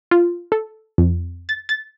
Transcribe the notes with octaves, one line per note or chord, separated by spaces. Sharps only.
F4
A4
F2
A6
A6